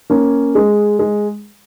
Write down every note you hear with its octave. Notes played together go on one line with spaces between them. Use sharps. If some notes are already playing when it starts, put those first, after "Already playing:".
A#3 C#4
G#3
G#3